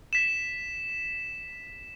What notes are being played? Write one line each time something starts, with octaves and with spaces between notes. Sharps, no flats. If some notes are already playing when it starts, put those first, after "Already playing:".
B6 E7